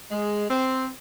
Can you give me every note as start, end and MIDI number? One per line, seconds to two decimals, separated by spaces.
0.11 0.45 56
0.50 0.88 60